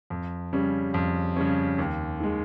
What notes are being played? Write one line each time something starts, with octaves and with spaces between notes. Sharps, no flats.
F2
C#3 G3 C#4
F2
C#3 G3 C#4
D#2
D#3 G#3